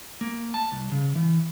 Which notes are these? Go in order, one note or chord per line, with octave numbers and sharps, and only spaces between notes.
A#3
A5
C2
C#3
E3